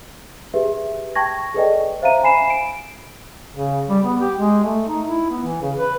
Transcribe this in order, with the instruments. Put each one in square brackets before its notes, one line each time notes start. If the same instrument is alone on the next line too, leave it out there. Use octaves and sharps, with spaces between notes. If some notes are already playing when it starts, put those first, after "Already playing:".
[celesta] G4 G#4 B4 E5
G5 A5 C#6 G#6 A#6
G#4 A4 B4 D5 D#5 G5
C5 E5 F5 A#5 D#7
G#5 B5 C7 E7
D7
[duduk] C#3
G3
B3
G4
G#3
A3
D#4
E4
B3
E3
C#3
B4